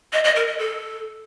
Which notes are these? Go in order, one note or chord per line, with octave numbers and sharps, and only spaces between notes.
D#5
D#5
A#4
D#5
A4